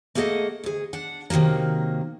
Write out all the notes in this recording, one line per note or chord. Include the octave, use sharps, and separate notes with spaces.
A3 A#3 G#4 A4 D#5 F#5
D2 G#4
D4 F#5
C3 D#3 F3 F#3 A#3